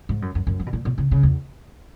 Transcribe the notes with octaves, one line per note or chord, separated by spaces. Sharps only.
G#2
F#2
F#2
F#2
E3
B2
A#2
B2
C#3
C#3
E2